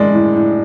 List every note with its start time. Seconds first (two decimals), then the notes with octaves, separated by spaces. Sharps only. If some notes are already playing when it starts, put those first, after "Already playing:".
Already playing: F#2 A2 D3 G#3 D5
0.14 A2
0.36 A2